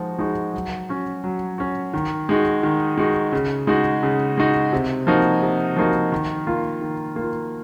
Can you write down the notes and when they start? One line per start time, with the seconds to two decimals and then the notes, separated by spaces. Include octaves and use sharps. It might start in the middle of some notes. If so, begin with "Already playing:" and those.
Already playing: F3 G#3 D#4 F#4
0.19 G#3 D#4 F#4
0.53 F#3
0.89 C#4 F#4
1.24 F#3
1.58 C#4 F#4
1.94 D#3
2.29 G#3 D#4 F#4
2.63 D#3
2.98 G#3 D#4 F#4
3.32 C#3
3.67 G#3 D#4 F#4
4.03 C#3
4.38 G#3 D#4 F#4
4.73 C3
5.07 F3 A#3 D#4 F#4
5.42 C3
5.76 F3 A#3 D#4 F#4
6.12 D#3
6.47 A#3 F4
6.81 D#3
7.16 A#3
7.21 F4